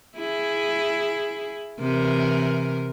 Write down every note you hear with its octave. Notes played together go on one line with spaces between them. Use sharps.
E4 G#4
C3 E3 A#4